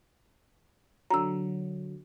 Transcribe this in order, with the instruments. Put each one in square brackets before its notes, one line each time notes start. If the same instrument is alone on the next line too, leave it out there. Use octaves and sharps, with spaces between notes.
[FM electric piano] D3 F#3 [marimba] A#5 E6